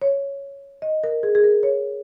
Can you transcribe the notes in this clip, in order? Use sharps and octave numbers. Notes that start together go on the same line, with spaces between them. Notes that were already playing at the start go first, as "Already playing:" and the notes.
C#5
D#5
A#4
G#4
G#4
A#4
C#5